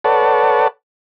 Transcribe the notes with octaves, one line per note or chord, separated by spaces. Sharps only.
A4 B4 C#5 D5 F#5 A5